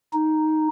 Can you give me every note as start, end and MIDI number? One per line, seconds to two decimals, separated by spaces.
0.13 0.68 63